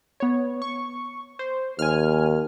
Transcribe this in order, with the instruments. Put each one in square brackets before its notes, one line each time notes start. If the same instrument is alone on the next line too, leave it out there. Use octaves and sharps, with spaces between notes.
[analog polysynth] B3 C#5
C#6
C5
[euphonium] D#2 [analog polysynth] G#5 F6